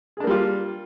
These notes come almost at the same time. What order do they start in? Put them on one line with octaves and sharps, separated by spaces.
G#4 D4 A#3 G3 F4